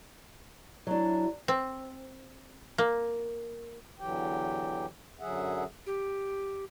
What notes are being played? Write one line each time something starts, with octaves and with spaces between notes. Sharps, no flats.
F#3 D4 E4
C4
A#3
E2 D3 E3 F#3 G4 G5
F#2 D3 F#3 G#4 E5 F#5
G4